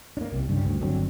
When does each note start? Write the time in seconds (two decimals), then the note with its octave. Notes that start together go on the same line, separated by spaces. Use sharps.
0.17 A#3 D4
0.32 C2 C3
0.49 G2 C#3 G3
0.65 D2
0.81 G1 D3 F#3 C4